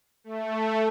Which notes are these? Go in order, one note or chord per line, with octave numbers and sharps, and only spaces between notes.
A3